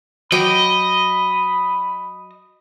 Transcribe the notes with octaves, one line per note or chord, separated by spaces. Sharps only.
F#3 D#5 G5 B5 D6